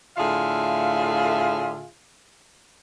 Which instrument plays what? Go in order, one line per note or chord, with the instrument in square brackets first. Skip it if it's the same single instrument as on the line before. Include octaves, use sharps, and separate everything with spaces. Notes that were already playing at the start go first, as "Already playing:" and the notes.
[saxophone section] A2 D3 F4 G#4 E5 F5